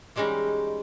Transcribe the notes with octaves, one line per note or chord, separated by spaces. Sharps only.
E3 G3 G#3 C#4 D#4